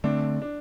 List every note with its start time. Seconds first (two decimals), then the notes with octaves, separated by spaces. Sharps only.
0.04 D3 A3 C4 D4
0.42 D4